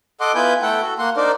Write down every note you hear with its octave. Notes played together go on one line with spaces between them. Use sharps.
A4 D#5 F#5 C6 D6
B3 E4 F4 B4 G#5 G6
A3 E4 A4 F#5 G5
F#4 A4
A#3 F#5 C6
D4 D#4 A#4 C5 D5